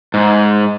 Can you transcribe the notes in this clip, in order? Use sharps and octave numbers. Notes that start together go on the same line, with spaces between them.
G#2